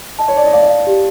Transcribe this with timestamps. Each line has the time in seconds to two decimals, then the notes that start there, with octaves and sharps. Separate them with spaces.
0.19 D#5 A5
0.28 C#5
0.36 D5 A5
0.45 D#5
0.53 D5 F5
0.61 D#5
0.70 F5
0.87 G4